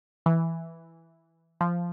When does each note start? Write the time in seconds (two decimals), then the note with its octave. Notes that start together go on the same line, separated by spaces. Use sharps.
0.26 E3
1.61 F3